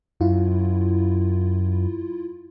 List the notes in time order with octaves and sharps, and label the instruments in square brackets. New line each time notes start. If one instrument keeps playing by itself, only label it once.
[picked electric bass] F#2 [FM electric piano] E4 F4